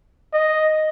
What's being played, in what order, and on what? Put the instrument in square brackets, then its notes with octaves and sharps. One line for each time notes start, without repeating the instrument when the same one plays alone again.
[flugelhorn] D#5